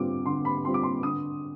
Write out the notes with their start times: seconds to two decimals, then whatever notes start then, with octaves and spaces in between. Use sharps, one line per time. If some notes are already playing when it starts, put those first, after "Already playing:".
Already playing: D3 G3 C4 F4 D6
0.26 D3 C6
0.45 B5
0.65 G3 C4 F4 C6
0.74 D6
0.83 C6
1.03 D3 D#6